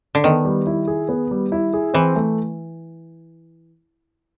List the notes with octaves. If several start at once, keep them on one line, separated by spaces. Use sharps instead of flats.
D3
D#3 B3
G3
E4
G#4
B3
G3
E4
G#4
E3 C4
A3